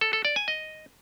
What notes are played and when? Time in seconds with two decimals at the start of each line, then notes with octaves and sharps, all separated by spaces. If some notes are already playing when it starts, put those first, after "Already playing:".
0.01 A4
0.13 A4
0.25 D5
0.36 G#5
0.48 D#5